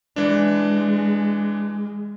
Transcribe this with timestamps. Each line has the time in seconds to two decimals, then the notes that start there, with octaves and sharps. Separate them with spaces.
0.16 E3 G#3 D4